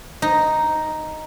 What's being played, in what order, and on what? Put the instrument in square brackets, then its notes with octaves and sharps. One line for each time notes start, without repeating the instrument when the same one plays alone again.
[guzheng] D#4